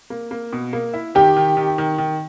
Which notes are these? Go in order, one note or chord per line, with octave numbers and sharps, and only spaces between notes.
A#3
A#3
B2
A#3
E4
D#3 G4
D#3
D#3
D#3
D#3